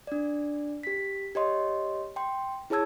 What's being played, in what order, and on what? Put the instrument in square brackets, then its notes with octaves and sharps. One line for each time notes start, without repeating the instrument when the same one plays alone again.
[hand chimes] D4 D5
G4 B6
G4 C#5 D#5 C6
G5 C6
E4 G#4 C#5 A5 E6 G#6